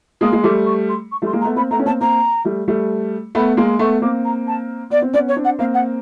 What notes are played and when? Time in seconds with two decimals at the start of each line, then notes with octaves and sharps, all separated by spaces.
0.21 G#3 A#3 D#6
0.33 G#3
0.43 G3 A3 D6
0.66 C#6
0.89 C6
1.11 C#6
1.22 G3 A3
1.26 C6
1.33 G#3 A#3
1.41 A#5
1.44 A3 B3
1.56 A#3 C4 B5
1.71 A3 B3 A#5
1.79 C#4
1.85 A#3 C4 A5
2.01 A#3 C4 A#5
2.45 G3 A3
2.68 G3 A3
3.35 A3 B3 B5
3.57 G#3 A#3 C6
3.79 A3 B3 C#6
4.02 A#3 C4 D6
4.24 A#5
4.47 A5
4.90 B3 D5
5.02 C4
5.13 B3 C#4 D5
5.28 C#5
5.36 C4 D4
5.44 F#5
5.59 A#3 C4 F5
5.74 F#5